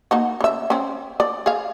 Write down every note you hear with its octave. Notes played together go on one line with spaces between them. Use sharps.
A#3 D#4 F#4
C#3 E5
C4 C#4
D5
G#4 F5